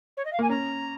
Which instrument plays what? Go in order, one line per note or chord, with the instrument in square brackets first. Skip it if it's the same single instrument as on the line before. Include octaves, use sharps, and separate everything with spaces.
[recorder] C#5
D#5
F5
[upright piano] A#3 [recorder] G#5
[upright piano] C#4 [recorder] A#5